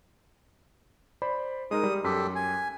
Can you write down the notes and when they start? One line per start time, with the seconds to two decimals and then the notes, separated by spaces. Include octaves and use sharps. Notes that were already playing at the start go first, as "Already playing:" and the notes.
1.22 C5 D5 B5
1.71 G#3 D#4 A#4 D#6
1.83 G3
2.04 F#2 G4 A4 B6
2.36 G#5